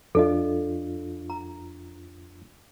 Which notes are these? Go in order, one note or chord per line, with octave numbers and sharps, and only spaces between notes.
F2 D4 F4 A4 D#5
A#5